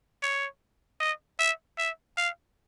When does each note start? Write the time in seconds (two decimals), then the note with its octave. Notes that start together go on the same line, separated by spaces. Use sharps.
0.23 C#5
1.00 D#5
1.39 E5
1.78 E5
2.17 F5